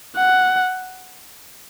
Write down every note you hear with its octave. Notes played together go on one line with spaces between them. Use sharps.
F#5